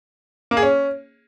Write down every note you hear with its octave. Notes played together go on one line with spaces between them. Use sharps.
A#3
G#4
C#4